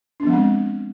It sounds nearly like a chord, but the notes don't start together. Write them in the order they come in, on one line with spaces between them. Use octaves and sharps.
D4 B3 F3 G#3 C4